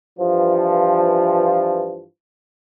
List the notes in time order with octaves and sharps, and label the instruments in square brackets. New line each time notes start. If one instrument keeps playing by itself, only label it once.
[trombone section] G2 E3 F3